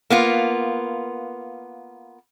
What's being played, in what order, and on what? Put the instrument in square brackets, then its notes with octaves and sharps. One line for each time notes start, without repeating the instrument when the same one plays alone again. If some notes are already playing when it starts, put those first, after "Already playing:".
[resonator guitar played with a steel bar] A#3 B3 F4